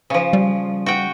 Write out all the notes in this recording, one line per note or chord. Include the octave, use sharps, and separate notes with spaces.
C#3 F3
G3
F#4 G5